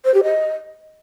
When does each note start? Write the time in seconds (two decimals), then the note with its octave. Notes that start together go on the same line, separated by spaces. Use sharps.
0.05 C5
0.14 G4
0.23 D#5